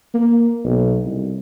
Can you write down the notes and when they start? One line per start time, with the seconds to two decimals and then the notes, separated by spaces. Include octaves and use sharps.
0.14 A#3
0.64 B1
1.05 C2